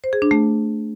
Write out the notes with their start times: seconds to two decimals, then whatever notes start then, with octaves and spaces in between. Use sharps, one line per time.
0.04 C5
0.13 G#4
0.22 D4
0.31 A3